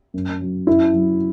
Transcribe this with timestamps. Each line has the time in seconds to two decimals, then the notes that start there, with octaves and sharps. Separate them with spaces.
0.14 F#2
0.40 F#3
0.67 F#2 E4
0.94 F#3